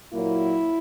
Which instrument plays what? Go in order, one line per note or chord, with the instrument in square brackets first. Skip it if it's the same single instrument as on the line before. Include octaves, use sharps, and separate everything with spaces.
[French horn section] A#2 F#3 A#3 E4